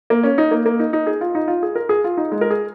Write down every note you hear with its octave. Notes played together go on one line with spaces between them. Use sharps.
A#3
C#4
D#4
A#3
A#3
D#4
D#4
G#4
F4
D#4
F4
G#4
A#4
G#4
F4
D#4
G#3
A#4
G#4